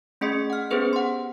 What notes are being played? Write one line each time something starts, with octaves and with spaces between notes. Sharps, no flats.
A3 C#4 G#4 D#5 C6 C#7
F#5 F6
B3 C#4 G4 G#4 B4 C5
F#5 C6